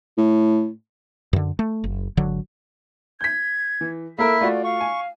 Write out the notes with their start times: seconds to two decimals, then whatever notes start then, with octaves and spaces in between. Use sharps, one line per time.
0.17 A2
1.33 F#2 D3
1.59 A3
1.84 F#1
2.17 G#1 D3 F#3
3.21 G6 G#6 B6
3.81 E3
4.18 A#3 E4 A4 A#4 E5
4.41 A3 F4 F#4 D5
4.65 F5 C#6
4.81 G#5